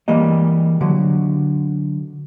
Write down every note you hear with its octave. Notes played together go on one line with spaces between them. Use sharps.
E3 G3 G#3 A#3 D#5
D3 F#3